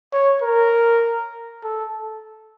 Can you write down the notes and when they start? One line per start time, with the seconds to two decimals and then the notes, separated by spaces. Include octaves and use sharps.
0.13 C#5
0.42 A#4
1.63 A4